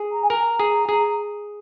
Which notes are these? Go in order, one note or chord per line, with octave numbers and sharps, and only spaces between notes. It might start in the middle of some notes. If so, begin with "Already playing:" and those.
Already playing: G#4
A#5
G#5
A#4 A#5
G#4
G#4